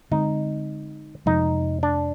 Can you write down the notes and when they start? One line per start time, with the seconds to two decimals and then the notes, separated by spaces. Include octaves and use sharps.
0.11 D3 G#3 C4 D#4
1.26 F2 C3 F3 G#3 D#4
1.83 D4